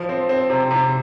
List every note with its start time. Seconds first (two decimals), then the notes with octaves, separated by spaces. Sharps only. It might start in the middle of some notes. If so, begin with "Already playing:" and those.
Already playing: F3
0.09 C4
0.29 C4
0.50 C3
0.70 C3